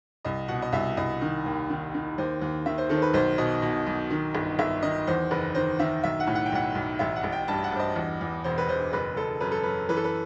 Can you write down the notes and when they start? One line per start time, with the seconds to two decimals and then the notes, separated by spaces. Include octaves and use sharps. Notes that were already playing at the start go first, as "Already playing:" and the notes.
0.25 C2 D#5
0.48 B2 F#5
0.62 D#5
0.72 C2 E5
0.97 C2 D#5
1.21 D#3
1.46 D#2
1.70 D#3
1.94 D#3
2.18 D#2 C5
2.41 D#2
2.66 D#3 E5
2.78 C5
2.89 D#3 A4
2.97 C5
3.02 B4
3.13 B1 C5
3.38 B2 D#5
3.62 B2
3.87 B1
4.10 D#3
4.35 G1
4.59 G1 E5
4.82 D#3 D#5
5.07 E2 C5
5.31 F#1 B4
5.55 D#3 C5
5.79 D#3 E5
6.03 B1 E5
6.20 F#5
6.27 A2
6.35 F#5
6.46 G5
6.52 B1 F#5
6.75 B1
6.99 A1 E5
7.16 F#5
7.23 A1
7.32 G5
7.48 G2 A5
7.64 F#5
7.72 G2 C5
7.80 D#5
7.96 E2
8.21 E2
8.44 E1 C5
8.58 B4
8.69 E1 C5
8.93 F#1 B4
9.16 F#1 A4
9.40 F#2 B4
9.52 A4
9.63 F#2 B4
9.89 E3 B4
9.97 A4
10.04 B4